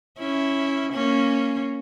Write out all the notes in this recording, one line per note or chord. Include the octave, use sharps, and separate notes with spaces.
C#4 E4
A#3 C#4